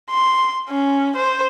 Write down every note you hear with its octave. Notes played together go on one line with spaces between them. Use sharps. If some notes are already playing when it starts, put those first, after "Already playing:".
C6
C#4
C5